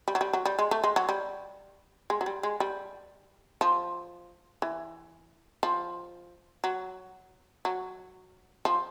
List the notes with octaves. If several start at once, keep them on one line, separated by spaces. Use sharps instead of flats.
G3
F#3
G3
F#3
G3
G#3
A3
G#3
F#3
G3
G#3
F#3
G3
G#3
G3
F3
E3
F3
F#3
F#3
F3